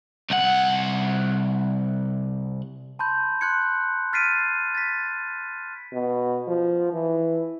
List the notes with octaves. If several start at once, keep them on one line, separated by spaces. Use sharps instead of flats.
C2 F#5
A5 B5 C6 G6
C6 F#6 G#6 C#7
F6 A6 B6 C7 D7 D#7
A6 B6
B2
F3
E3